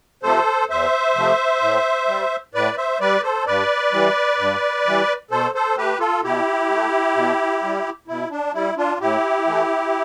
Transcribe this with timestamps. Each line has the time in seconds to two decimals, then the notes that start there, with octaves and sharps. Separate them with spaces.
0.23 C3 F3 A3 A4 C5
0.70 E2 C5 E5
1.16 C3 F3 A3
1.62 A2
2.08 G3
2.54 A2 B4 D5
2.77 C5 E5
3.00 G3 B4 D5
3.23 A4 C5
3.46 G2 B4 D5
3.92 E3 G3
4.39 G2
4.86 E3 G3
5.31 B2 A4 C5
5.55 A4 C5
5.77 A3 G4 B4
6.00 F4 A4
6.24 B2 E4 G4
6.70 A3
7.16 B2
7.63 G3
8.08 B2 E4
8.31 D4
8.54 G3 E4
8.77 D4 F4
9.00 A2 E4 G4
9.47 E3 A3